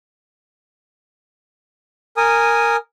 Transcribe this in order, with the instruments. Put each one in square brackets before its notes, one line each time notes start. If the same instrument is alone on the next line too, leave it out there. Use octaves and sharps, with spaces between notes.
[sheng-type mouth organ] A#4 G#5 D#6